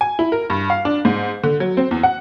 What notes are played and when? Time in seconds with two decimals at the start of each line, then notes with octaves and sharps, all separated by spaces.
0.01 G#5
0.19 E4
0.32 A#4
0.50 G2
0.70 F5
0.85 D4
1.05 G#2
1.44 D3
1.60 F#3
1.77 C4
1.91 E2
2.03 F#5